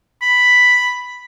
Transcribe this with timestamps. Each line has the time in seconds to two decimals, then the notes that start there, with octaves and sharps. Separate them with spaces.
0.22 B5